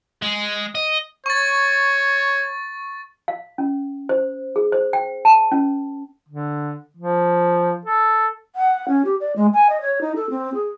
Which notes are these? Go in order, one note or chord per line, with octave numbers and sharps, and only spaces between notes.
G#3
D#5
C#5 C#6 A6
F5
C#4
C5
G#4
C5
G5
A5
C#4
D3
F3
A4
F#5
C#4
G4
D5
G#3
G#5
D#5
C#5
D#4
A4
C4
G#4